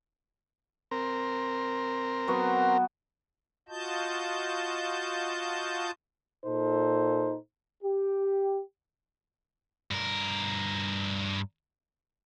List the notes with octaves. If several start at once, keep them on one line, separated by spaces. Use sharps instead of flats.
C4 A#4
F#3 B3 F#4
F4 F#4 D#5 A5 G6
A#2 D#4 A4 C5
G4
G2 A#4